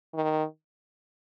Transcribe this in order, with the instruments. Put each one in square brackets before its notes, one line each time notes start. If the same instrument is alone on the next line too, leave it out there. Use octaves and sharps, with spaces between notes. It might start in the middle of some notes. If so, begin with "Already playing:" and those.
[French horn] D#3